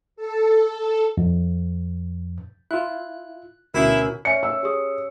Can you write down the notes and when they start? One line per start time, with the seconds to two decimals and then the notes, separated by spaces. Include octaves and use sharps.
0.16 A4
1.17 F2
2.71 E4 F4 F#6
3.74 D2 B2 C#4 E4 F#4 A#4
4.25 C#4 D5 E5 G#5 C#7
4.43 E6
4.63 G4 G#4 D#6